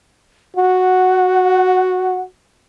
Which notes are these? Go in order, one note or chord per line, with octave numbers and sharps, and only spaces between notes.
F#4 F#5